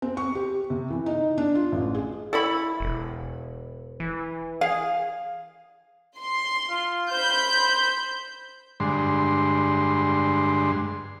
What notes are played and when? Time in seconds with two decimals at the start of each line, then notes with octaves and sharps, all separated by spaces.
0.02 C4
0.17 C#6
0.35 G4
0.70 C3
0.90 E3
1.06 D#4
1.38 D4
1.55 F4
1.72 A1
1.95 G#4
2.33 E4 A4 C#5 B5
2.80 E1
4.00 E3
4.61 G#4 F5
6.19 C6
6.70 F4
7.11 C5 B5 G6
8.80 G2 D3 G#3 C6